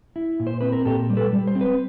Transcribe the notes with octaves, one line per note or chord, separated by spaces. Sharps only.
E4
A#2
C5
C4 B4
A#4
A#2 G4 A4
G3
A4 B4
G3
C5
C4
B4